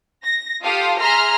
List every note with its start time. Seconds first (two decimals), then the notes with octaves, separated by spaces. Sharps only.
0.24 A#6
0.63 F4 G4 A4 F5 D#6
0.99 G#4 E5 A#5 C6 F6